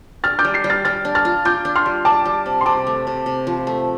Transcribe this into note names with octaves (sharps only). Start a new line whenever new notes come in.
D4 F6 A6
D6 G6
G3
G6 C7
G3
F6 A6
G3 F6 A6
D4
F6 A6
F4
F4 D6 G6
D4
C6 F6
G3
D4 A5 D6
G3
C3
C6
C3 A5 D6
A3
C3
C3
F3
A3